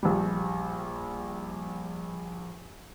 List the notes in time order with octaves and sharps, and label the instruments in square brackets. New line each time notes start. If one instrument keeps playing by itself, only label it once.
[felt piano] A#1 G3